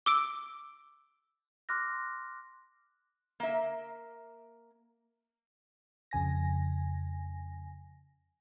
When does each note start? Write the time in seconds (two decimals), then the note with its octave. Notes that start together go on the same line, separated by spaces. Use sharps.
0.06 D6 E6 D7
1.69 C6 D6 F6 F#6 A#6
3.40 A#3 E5
6.11 F2 C#3 G#5 A#6